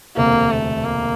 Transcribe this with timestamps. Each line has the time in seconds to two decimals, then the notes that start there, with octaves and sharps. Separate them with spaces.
0.17 E1 D2 C3 A#3
0.51 A3
0.85 A#3